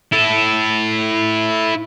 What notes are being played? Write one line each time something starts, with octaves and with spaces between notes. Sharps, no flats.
E4 A4